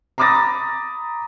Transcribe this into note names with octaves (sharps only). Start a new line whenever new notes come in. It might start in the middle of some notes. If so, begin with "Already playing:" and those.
A#5 B5 D6 D#6 A6 A#6